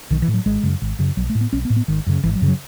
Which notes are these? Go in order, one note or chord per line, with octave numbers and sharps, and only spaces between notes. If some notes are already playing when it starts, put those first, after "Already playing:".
B1 D#3
E3
A2
F#3
G#1 G#3
F#2 C#3
G#1
F#2 C#3
B1 F#3
A3
A2
B3
B1 C#4
B3
A2
B3
G#1 D#3
F#2 C#3
G#1 E3
F#3
F#2 C#3
F#3